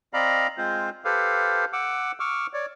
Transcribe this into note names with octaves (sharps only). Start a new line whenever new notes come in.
C4 D5 D#5 F5 A#5 B5
G#3 C4 F4 C5
G4 A4 B4 C5 F5
F#5 D6 E6
C#6 D6 E6 F6
C#5 D5